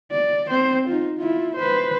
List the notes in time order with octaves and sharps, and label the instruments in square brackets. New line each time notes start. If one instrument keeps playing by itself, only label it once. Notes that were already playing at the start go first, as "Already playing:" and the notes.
[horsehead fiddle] D5
C4 C5
D#4 F4
E4 F4
B4 C5